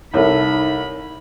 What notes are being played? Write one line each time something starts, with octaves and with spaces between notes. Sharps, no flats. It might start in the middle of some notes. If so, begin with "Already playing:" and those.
C2 D#4 A4 A#4 C#5 E5 B5